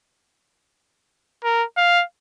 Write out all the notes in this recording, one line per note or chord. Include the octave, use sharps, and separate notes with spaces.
A#4
F5